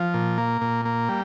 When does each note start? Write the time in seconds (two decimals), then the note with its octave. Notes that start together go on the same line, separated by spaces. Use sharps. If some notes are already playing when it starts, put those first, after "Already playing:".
Already playing: F3
0.14 A#2
0.38 A#3
0.61 A#2
0.85 A#3
1.09 G3